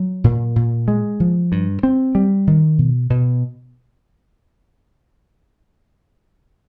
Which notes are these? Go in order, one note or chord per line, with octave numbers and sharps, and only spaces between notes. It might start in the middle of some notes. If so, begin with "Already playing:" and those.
Already playing: F#3
A#2
A#2
G#3
F3
G2
C4
G3
D#3
B2
B2